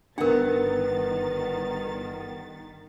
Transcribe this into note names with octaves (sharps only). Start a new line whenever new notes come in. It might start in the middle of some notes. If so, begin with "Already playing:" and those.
G1 D#3 B3 D4 A#4 F#5 A6